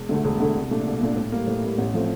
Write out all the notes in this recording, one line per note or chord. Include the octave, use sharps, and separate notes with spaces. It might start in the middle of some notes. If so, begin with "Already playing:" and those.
Already playing: E1
D2 D3 A3
E1
D2 D3 A3
C2
A#2 A3 D4
C2
A#2 A3 D4
A2
G3 A#3
A2
G3 A#3
A1
F3 A3 C4